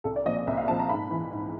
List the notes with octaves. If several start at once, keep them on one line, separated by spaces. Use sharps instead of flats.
C2 A4
D5
A#2 F3 D#5
D#5
C2 E5
F5
A#2 F3 A5
A#5
G#2 B5
E3
G#2